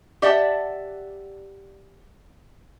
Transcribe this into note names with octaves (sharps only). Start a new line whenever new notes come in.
G4 D5 E5 F#5 A5